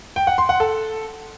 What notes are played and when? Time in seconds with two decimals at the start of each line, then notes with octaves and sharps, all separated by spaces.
0.16 G5
0.27 F#5
0.38 C6
0.49 F#5
0.60 A4